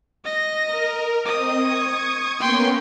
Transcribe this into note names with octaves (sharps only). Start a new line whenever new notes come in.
D#5 A#6
A#4
C4 D#5 D#6
C#6 G#6
A#3 B3 C#4 G5 C6